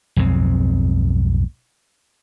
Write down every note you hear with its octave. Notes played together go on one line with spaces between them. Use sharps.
B1 F2 G#2 C4